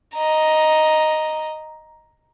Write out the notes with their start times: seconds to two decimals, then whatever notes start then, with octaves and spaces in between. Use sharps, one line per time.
0.14 D#5 A#5